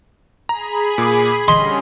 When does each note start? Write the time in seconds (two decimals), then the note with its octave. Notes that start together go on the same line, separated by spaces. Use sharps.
0.49 G#4 A#5 B5
0.98 A#2 D6
1.48 D3 G3 C#4 D#5 C6